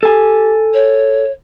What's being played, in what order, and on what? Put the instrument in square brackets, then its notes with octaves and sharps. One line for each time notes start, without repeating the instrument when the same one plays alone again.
[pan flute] G4 [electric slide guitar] A4 G#5
[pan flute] C#5